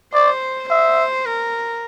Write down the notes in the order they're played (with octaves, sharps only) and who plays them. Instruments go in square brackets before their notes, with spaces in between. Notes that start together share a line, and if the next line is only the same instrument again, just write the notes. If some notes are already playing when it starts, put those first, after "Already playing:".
[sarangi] C5 [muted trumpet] D5
[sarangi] C5 [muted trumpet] E5
[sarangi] A#4